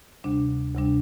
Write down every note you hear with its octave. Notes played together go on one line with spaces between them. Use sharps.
D2 C3 G3 D4
D2 C3 G3 D4